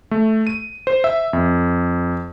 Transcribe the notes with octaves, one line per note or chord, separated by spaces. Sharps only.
A3
D#7
C5
E5
F2